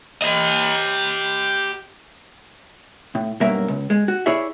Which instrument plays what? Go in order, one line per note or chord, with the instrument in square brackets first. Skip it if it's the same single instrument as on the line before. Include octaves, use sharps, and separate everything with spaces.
[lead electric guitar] G4 D#5
[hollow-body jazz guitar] A2
B1 G2 F#3 A#3 A#4 E5
C#2
G#3
F#4
E4 G#4 C#5 D5 E5